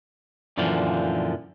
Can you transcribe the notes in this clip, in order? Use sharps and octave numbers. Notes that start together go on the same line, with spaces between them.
F#2 A#2 D3 E3 F3